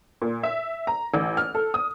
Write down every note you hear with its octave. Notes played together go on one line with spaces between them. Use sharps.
A#2
E5
A#5
A1
F6
A4
D#6